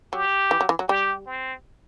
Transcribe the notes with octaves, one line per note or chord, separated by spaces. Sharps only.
F#3 G4
E3
F#3
E3
F#3
G3 G4
C4